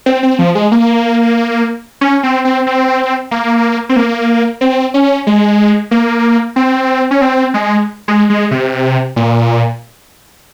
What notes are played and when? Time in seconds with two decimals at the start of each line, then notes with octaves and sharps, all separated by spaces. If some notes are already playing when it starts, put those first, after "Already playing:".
0.06 C4
0.23 C4
0.39 F3
0.55 G#3
0.72 A#3
2.01 C#4
2.23 C4
2.45 C4
2.67 C4
3.31 A#3
3.89 C4
3.96 A#3
4.61 C4
4.94 C#4
5.27 G#3
5.91 A#3
6.56 C4
7.11 C#4
7.21 C4
7.54 G#3
8.08 G#3
8.30 G#3
8.51 C3
9.16 A#2